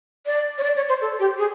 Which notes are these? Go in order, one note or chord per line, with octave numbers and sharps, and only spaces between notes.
D5
C#5
D5
C#5
C5
A4
G4
G#4